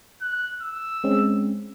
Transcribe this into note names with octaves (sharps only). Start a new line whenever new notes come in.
F#6
E6
G#3 C4 C#4